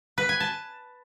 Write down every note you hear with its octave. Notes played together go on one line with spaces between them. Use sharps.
B4
G#5
A5